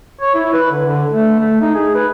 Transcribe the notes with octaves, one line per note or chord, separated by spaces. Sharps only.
C#5
E4
B4
D3
D3
A3
A3
D#4
G#4
B4